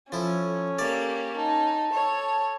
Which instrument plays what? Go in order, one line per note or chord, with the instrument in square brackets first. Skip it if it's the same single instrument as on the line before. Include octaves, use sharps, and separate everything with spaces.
[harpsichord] F3 E4 [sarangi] C#4 [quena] A4
[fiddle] A#3 G4 [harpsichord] D5
[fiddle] D#4 [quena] A5
[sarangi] A4 [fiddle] C#5